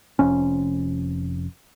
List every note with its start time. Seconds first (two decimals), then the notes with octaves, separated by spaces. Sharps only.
0.19 F1 F2 C#4